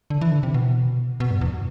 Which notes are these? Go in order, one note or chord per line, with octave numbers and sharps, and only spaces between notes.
D3
E3
D3
C3
B2
B2
G2
E2